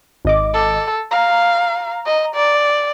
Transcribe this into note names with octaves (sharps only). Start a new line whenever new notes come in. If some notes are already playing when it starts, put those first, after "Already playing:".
G#1 D#5 D6
A4
F5 A#5
D#5
D5